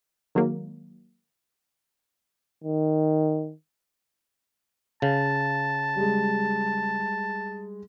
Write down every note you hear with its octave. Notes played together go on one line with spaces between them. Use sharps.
D#3 F#3 G#3 A#3
D#3
C#3 A5
G3 G#3